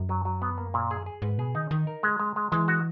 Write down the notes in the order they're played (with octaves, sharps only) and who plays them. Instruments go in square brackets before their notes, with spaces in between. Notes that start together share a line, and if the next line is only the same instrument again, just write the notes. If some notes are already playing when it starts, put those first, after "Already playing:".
Already playing: [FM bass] F#2
[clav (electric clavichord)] F#3
F#3
B3
A#3
A#2
G#4
G#4
[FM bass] G#2 [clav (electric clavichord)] B4
[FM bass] B2 [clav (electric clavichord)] G#4
[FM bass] D#3 [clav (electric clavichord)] D#4
[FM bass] D#3 [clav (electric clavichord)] D#4
[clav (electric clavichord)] A#4
G#3
G#3
G#3
[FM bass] E3 [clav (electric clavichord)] G#3
[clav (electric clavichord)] F#4